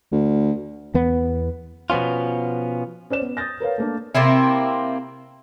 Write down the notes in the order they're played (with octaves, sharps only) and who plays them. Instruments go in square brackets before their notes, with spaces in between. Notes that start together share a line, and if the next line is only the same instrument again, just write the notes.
[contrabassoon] D2
[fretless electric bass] E2 B3
[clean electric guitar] B2 F3 B3 C#4 F4
[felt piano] C#4 C5 D5 E7
B3
D#6 G6 A6 A#6
A#4 B4 C#5 F5
A3 A#3 D4
[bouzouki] C3 A#3 C4 E4